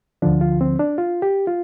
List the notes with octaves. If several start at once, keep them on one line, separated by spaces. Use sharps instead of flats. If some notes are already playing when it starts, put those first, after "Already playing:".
D2 D3 F3 D4
F4
C4
D4
F4
G4
F4